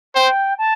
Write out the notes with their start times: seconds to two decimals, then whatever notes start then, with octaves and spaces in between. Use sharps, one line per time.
0.15 C5 G5
0.58 A5